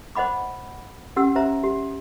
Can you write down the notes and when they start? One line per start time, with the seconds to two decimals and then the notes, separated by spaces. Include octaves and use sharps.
0.15 C5 D#5 F#5 B5 D6
1.16 C#4 G4 F#5 E6
1.35 G4 C5 E5 A#5
1.63 G4